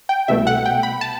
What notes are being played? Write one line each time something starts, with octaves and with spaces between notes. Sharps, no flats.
G5
C2 B2 A3 E5
F#5
G5
B5
A5